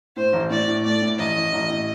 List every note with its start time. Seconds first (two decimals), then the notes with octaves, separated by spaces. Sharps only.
0.16 A2 C5
0.33 A1
0.50 A2 D5
0.68 A2
0.84 A3 D5
1.02 A2
1.18 A1 D#5
1.36 A1
1.53 A1
1.70 A2